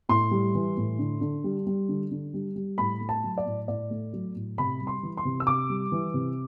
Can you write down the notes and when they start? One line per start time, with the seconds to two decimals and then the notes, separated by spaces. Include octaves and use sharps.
0.09 A2 C6
0.31 G3
0.55 E3
0.77 A2
0.99 D3
1.21 D3
1.44 G3
1.67 G3
1.89 D3
2.11 D3
2.34 G3
2.56 G3
2.78 A2 B5
3.00 A3
3.09 A5
3.24 F#3
3.38 D5
3.46 A2
3.68 A2 D5
3.91 A3
4.13 F#3
4.36 A2
4.58 C3 B5
4.81 G3
4.87 C6
5.03 E3
5.17 C6
5.25 C3
5.40 E6
5.47 C3 D6
5.70 G3
5.92 E3
6.14 C3